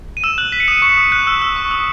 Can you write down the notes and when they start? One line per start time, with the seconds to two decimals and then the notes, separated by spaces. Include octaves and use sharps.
0.17 D#7
0.24 E6 E7
0.38 F#6 F#7
0.52 B6
0.60 C#7
0.68 D#6 D#7
0.82 C#6 C#7
0.97 D#6
1.12 F#6
1.27 E6
1.42 E6
1.56 C#6
1.71 D#6